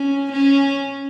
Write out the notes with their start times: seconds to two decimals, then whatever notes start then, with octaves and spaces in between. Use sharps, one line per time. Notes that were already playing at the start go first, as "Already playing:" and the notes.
Already playing: C#4
0.32 C#4